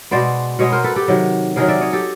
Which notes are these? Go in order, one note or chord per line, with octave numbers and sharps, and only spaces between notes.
B2 G#3 B3 C5 D5
B2 G#3 B3 C#5 D#5
A#4 C5
A4 B4
G4 A4
C3 D#3 F#3
C3 D#3 F#3 G#4 A#4
D5 E5
C#5 D#5
G4 A4